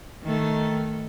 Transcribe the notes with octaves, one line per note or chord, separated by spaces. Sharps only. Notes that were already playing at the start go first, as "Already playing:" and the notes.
D#3 A3